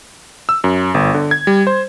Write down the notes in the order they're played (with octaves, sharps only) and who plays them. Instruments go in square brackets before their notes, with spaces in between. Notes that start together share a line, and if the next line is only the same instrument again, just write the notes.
[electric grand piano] E6
F#2
G1
D3
G#6
G3
C5